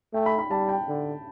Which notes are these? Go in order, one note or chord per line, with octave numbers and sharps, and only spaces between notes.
A3 G5
B5
B5
G3 A5
G5
D3